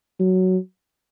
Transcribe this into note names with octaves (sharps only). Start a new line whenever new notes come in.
F#3